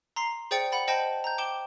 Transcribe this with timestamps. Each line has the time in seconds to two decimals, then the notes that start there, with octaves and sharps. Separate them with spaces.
0.16 A#5 C6 C7
0.51 G#4 C5 D5 G5 A6 C#7
0.72 F#5 B5 A6
0.88 C5 D#5 G5 A5 B5 G6
1.24 A#5 G6
1.38 G5 D6 E7 G7